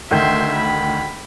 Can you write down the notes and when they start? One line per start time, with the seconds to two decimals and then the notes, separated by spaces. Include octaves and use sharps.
0.11 D2 D#3 E5 C6 G6
0.55 B5